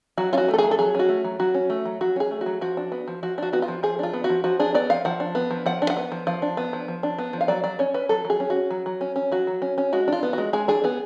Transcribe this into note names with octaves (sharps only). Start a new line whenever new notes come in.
F#3 F#4
C#4 F4 F#4
A3
A4
F#3 G#4
A4
F#3 G#4
C#4 F#4
A3
F#3
F#3 F#4
C#4
A3
F#3
F#3 F#4
C#4 G#4
A3
F#4
F#3
F3 F#4
D4
B3
F3
F3 F#4
D4 F#4
B3 F#4
F4
F3
F3 G#4
D4 F4
B3
F#4
F3
F3 F#4
D4 G#4
B3 D5
F3 F5
F3 F#5
D4
B3
F3
F3 F#5
D4
F#5
B3
F3
F3 F5
D4
B3
F3
F3
D4
B3
F3
F5
F#3 D5
F#3 D5
C#4 C#5
C#4 B4
F#3 A4
F#3
G#4
C#4
F#4
C#4
F#3
F#3
C#4
C#4
F#3 F#4
F#3
C#4
C#4
G#3 F#4
D4 F4
B3
G#3 F#4
G#3 G#4
D4 G#4
B3 G#4